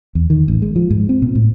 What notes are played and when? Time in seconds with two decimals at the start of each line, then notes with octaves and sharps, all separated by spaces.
0.15 E2
0.30 D#3
0.48 A1
0.62 G#3
0.76 F3
0.90 G#2
1.09 C4
1.22 B2
1.35 A2